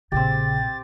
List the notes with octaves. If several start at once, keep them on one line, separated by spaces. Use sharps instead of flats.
A#1 A#2 C#3 C4 G4 A6